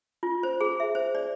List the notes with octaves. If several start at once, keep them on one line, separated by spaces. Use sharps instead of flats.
F4
C5
G#4
E5
C5
D5